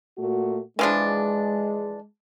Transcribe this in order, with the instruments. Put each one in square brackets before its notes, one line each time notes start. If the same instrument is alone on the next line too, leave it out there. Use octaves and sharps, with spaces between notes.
[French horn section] A#2 A3 F#4
[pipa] E3 F3 D4 [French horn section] G#3